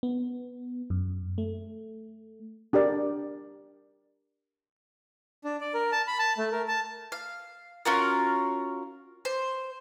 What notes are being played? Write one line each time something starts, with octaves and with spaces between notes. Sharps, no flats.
B3
F#2
A3
D4 G4 A#4 D5
D4
D5
A#4
A5
B5
A5
A3
A#4
A5
F5
C#4 F4 F#4 A#4
C5